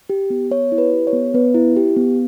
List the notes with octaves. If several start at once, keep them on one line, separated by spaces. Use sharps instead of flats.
G4
B3
B3 C#5
E4
B4
G4
C#5
B3
B3 B4
E4
G4
B3